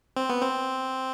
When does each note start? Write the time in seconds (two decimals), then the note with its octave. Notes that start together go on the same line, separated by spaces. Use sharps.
0.17 C4
0.30 B3
0.42 C4